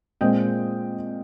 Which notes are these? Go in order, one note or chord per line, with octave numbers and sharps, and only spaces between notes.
A#2 G#3 C4 D#5 G5